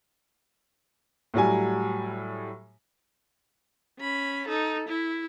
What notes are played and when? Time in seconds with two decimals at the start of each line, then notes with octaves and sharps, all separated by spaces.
1.34 A2 F#3 G3 G#5
3.99 C#4 B5
4.48 D#4 A4
4.89 E4